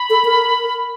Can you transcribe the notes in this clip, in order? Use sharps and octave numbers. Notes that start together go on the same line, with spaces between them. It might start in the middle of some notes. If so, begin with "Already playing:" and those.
Already playing: B5
A4
A#4